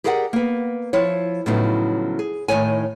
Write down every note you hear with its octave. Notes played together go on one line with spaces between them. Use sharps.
G4 G#4 A#4 D5 E5 F#5
A#3 B3
F3 E4 C#5
A2 C#3 F3 F#3 B3 D#4
G#4
A2 D#3 D#4 C#5 G#5